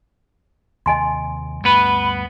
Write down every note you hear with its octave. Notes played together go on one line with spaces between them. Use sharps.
D#2 C3 D#5 G#5 C6
D2 G2 A3 B3 B4 B5